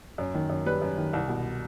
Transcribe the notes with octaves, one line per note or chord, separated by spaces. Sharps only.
F#2
D#3
F#2
G3 B4
F#2
D#3
C2
B2